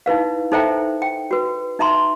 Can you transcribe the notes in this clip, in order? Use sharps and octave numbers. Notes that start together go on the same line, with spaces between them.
D#4 E4 B4 F5
D#4 A4 C5 E5 G5 A#5
G5
F#4 B4
D#4 E5 A#5 C6